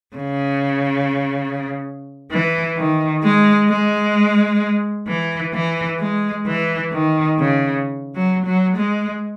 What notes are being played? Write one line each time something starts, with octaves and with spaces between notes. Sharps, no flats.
C#3
E3
D#3
G#3
G#3
E3
E3
G#3
E3
D#3
C#3
F#3
F#3
G#3